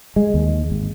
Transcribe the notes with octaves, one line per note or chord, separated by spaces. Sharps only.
G#3
D#2
G#1